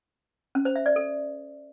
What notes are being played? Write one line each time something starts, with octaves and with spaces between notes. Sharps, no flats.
C#4
C5
E5
D5
A4